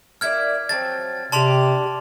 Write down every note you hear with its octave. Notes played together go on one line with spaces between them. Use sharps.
A#3 E4 D5 F6 G#6
F3 F#3 C4 A6
C3 D4 G4 A5 C6 F7